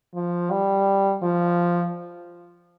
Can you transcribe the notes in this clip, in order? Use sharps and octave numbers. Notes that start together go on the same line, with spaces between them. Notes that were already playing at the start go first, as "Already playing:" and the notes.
F3
G3
F3